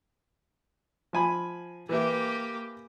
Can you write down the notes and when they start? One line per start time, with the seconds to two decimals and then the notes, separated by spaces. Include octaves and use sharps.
1.13 F3 G#5 B5
1.89 E3 A#3 G4 B4 E5